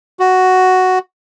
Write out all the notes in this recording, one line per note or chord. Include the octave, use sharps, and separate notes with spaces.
F#4